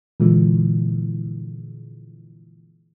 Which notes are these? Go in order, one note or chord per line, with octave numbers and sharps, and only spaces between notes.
A#2 D3 E3 F3 G#3